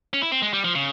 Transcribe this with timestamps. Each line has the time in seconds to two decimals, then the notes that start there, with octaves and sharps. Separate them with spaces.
0.13 C#4
0.22 E4
0.32 C4
0.42 G#3
0.53 G3
0.65 F3
0.75 C#3